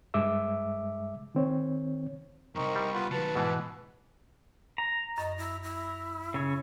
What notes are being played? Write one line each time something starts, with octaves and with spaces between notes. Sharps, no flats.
G2 G#3 E5 D6 E6
D#3 C4 C#5
C2 F2 C4 D#4 A#4 C#6
G3
B3 F4 B4
D#3 F#3 B4 A5
G#2 B2 E3
A#5
F#2 D#5
E4
E4
C#3 C#5